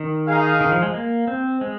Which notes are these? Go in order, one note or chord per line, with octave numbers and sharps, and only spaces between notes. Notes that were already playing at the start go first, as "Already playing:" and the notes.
Already playing: D#3
D#4 G#4 F5
D#3
F3
G#3
A#3
C4
G#3